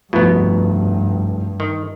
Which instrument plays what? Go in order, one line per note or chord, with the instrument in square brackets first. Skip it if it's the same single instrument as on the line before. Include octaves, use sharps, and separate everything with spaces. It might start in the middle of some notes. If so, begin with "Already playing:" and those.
[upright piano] F1 C2 [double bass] G2 [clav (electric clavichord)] B2 B3
[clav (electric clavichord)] D#3